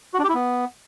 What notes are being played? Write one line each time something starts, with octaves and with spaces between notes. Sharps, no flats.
F#4
D4
G4
E4
B3